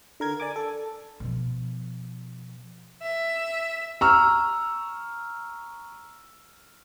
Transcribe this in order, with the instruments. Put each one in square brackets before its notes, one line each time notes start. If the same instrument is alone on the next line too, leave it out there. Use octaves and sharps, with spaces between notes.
[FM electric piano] D3 A#4 G#6
D5 G#5 D6
A4
[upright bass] B2 F3
[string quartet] E5
[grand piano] A#5 C#6 E6 F6